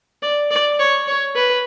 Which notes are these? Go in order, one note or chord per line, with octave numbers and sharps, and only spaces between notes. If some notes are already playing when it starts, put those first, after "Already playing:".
D5
D5
C#5
C#5
B4